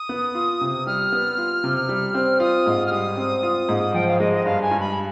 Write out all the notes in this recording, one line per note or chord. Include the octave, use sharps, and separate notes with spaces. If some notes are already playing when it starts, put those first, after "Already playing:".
Already playing: D#6
B3
F4
C3
G3 F6
B3
F4
C3
G3
C4
F4 D#6
G#2
F6
G3 D#6
C4
F4
G#2
F3 G5
F5
G#3 D#5
D#5
G2 F5
G#5
G2
B5